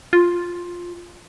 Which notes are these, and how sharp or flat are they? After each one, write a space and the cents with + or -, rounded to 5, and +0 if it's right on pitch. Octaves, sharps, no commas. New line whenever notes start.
F4 +5